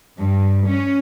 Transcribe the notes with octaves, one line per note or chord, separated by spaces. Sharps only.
G2
C#4